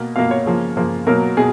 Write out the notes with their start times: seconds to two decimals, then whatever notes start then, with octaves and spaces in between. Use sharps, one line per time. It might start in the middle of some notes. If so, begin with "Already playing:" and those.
Already playing: B2 A#3
0.16 B2 A#3 F5
0.31 C#5
0.46 C#3 F3 A#3
0.77 C#3 F3 A#3
1.07 B2 F#3 A#3 A#4
1.37 B2 G#4